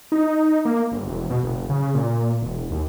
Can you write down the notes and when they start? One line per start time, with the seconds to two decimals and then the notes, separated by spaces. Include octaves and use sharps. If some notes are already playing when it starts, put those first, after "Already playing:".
0.12 D#4
0.65 A#3
0.92 G1
1.07 E1
1.30 B2
1.43 F#1
1.69 C#3
1.95 A#2
2.42 E1
2.71 D#2